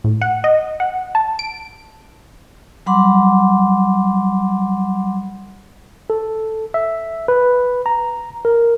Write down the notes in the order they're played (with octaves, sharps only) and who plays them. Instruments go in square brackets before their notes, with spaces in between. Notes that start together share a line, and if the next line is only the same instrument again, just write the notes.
[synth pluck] A2
F#5
D#5
F#5
A5
D7
[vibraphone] F#3 G3 F#5 B5 C6 D6
[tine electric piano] A4
E5
B4
A#5
A#4